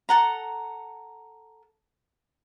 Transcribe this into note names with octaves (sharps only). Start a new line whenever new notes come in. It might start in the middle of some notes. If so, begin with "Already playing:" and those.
A4 F#5 A#5